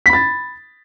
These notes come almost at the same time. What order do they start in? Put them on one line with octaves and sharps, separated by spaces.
B6 B5 A6